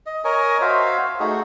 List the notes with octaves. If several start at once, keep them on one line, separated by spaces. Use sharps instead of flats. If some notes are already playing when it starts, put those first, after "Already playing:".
D#5
A#4 C#5 D#5 G#5
F#4 C5 E5 F5
A3 D#4 F#4 G#4